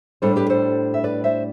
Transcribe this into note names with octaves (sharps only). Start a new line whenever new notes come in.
A2 G3 D4 A4 C5
G4 B4
A4 C5
E5
B4 D5
C5 E5